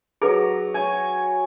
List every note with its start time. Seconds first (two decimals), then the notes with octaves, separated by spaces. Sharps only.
0.22 F#3 G#4 A4 B4 A#5
0.74 C#5 G#5